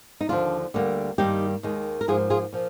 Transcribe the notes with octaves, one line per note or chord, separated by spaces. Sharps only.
D#4
D#2 D3 F3 D4 F4
D2 D3 G3 A#3
G2 D#3 G3 A#3 D#4 G4
D#2 D#3 G#3
A#4
G#2 F3 A#3 F4 G#4
F4 G#4
A#2 F3